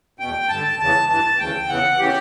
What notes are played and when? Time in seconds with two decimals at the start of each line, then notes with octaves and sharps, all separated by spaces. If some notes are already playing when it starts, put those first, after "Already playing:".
0.20 E2 B2 G5
0.49 G2 D3 A5
0.79 E2 C#3 E3 A5
1.09 G2 E3 A5
1.39 D2 C#3 E3 G5
1.69 E2 C#3 E3 F#5
1.99 C#3 E3 G4